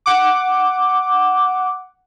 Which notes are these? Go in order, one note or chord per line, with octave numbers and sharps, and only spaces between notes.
F#5 D6